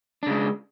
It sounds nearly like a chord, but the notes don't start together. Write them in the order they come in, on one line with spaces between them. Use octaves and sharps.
D4 C#3 G#3